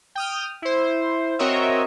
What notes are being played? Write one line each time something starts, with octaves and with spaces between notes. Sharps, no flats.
G5 D#6 F6
E4 C5
C4 F#4 A#4 C#5 D#5 E5